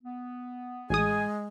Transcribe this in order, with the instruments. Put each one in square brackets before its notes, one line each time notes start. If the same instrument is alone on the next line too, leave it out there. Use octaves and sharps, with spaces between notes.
[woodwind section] B3
[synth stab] A1 D#6 [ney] G#3 [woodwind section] G#4 [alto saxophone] G#5